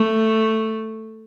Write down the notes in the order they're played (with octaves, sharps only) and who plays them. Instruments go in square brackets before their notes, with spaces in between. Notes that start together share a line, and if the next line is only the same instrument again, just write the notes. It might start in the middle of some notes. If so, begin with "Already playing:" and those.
Already playing: [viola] A3